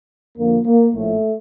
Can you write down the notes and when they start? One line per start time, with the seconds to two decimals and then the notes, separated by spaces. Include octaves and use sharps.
0.36 F2 D3 F3 A#3
0.66 A#3
0.93 A#1 A2 F3 A3